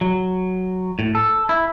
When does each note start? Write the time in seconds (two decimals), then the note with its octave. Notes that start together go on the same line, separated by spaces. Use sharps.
0.01 F#3
0.99 A2
1.15 A4
1.49 E4